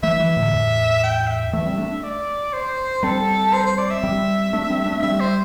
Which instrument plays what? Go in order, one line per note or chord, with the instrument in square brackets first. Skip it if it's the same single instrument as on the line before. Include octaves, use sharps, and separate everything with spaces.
[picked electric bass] E3 A3 [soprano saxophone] E5
[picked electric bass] E3 A3
A2 D3
E2 A2
[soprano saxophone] G5
E5
[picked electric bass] E3 A3 [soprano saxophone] E5
[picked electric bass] G3 C4
A3 D4
[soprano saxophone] D5
C5
[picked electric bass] G3 C4 [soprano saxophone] A4
[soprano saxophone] C5
C5
D5
E5
[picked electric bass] G3 C4
A3 D4
G3 C4
A3 D4
[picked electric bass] G3 C4 [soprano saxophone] E5
[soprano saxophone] C5